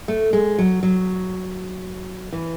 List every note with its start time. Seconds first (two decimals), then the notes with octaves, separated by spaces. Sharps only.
0.08 A3
0.33 G#3
0.59 F#3
0.83 F#3
2.33 E3